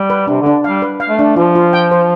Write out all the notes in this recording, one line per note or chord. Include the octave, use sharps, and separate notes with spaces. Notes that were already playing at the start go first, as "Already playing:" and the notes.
Already playing: G3
B4
C3 D4
D3 D4
G3 F5
B4
F5
A3
D4
F3 F4
F4
G5
C5